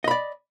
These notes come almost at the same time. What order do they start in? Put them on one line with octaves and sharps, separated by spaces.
D#5 B5 D5